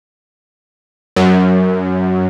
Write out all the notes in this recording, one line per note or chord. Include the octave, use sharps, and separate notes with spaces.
F#2